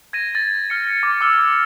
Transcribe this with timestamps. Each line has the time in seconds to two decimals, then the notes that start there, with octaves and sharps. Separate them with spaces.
0.13 G#6 A#6 D#7
0.35 A6
0.70 F6 C#7
0.90 A#6
1.03 D6
1.21 D6 E6 F6